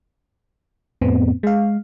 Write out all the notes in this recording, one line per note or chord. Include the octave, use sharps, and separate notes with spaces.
F2 A2 B3 C4
G#3 F5